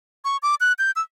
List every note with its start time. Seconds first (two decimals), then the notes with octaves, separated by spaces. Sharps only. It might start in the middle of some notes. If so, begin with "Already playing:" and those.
0.25 C#6
0.43 D6
0.61 F#6
0.79 G6
0.96 E6